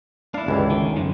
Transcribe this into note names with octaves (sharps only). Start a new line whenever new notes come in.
D4 E4 F5
G1 C#2 E3
D#3
F#2 D3 F3